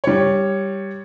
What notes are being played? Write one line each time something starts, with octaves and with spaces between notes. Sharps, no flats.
G3 C#5